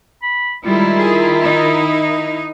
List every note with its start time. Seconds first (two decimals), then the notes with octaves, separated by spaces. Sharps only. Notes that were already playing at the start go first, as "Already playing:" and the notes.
0.23 B5
0.65 D#3 G3 G#3 E4 F4 A#4
0.98 G#4
1.44 D#4